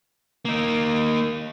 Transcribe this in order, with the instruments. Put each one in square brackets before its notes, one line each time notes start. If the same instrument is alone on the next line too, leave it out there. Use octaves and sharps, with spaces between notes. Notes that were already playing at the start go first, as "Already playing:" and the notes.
[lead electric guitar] A#3 D#4